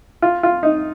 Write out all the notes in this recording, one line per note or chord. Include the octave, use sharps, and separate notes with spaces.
F4
F4
D#4